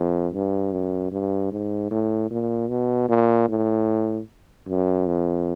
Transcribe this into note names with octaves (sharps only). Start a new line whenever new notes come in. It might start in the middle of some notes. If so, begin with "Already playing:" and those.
Already playing: F2
G2
F#2
G2
G#2
A2
A#2
B2
A#2
A2
F#2
F2